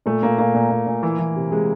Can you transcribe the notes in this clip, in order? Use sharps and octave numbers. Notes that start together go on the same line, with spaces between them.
A#2 A3
A#2 A#3
A#2 A#3
A#2
A#2
A#2
E3
E3
C3
C3 G#3